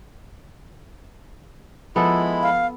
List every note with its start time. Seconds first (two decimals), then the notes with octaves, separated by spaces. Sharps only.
1.96 F3 G#3 B3 E4 A4 B5
2.43 F5